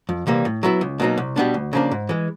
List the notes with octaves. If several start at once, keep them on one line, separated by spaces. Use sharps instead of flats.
F2
C3 E3 G3 A#3
A2
F#3 B3 E4
C#2
B2 F#3 A#3 D#4
C2
B2 G3 B3 D4
D2
C#3 F3 A#3 D4
G#2
E3 G#3